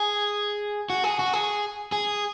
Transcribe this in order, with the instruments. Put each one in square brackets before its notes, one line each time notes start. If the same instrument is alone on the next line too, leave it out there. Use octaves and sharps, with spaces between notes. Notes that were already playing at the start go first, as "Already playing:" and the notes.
Already playing: [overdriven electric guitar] G#4
F#4
G#4
F#4
G#4
G#4